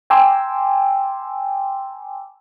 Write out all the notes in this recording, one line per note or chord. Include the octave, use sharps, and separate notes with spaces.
G5 G#5 A#5 C6 D6 E6